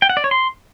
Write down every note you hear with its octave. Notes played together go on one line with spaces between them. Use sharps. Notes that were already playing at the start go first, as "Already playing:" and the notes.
G5
F#5
D5
C#5
C6